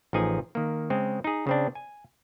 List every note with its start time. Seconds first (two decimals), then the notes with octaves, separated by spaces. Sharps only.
0.13 A1 F3 D#4 G#4 G#5
0.55 D#3 A#3
0.90 C#3 G#3 C4
1.24 D#4 G#4
1.47 C#3 C4 D4
1.75 G#5